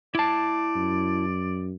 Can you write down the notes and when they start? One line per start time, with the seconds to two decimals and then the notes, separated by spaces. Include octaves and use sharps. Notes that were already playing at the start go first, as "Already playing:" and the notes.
0.15 E4 D5 A5
0.76 F#2